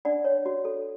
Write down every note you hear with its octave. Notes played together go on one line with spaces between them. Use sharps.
D4 D5 F#5
C#5
F#4
A4